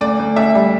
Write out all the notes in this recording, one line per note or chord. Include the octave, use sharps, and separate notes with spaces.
D2 D5
D2
D2 E5
G3